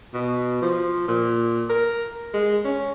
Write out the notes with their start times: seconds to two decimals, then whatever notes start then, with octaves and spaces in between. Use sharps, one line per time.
0.14 B2
0.62 F3
1.08 A#2
1.69 A#4
2.34 G#3
2.64 C#4